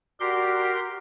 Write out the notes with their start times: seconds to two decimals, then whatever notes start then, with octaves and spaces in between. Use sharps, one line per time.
0.20 F#4 G4 A#4 D5 C6